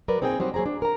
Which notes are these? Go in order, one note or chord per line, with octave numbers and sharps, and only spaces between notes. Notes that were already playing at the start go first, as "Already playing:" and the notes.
F#3 A#4 B4 D5
A#2 C4 D#4 G#4 C#5 G5
F#3 G3 C4 D#4 F#4
F#3 A#3 G#4 C5 A#5
D4
A#4 A#5